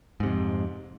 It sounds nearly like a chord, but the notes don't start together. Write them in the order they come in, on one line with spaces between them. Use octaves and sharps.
G#2 C3 F2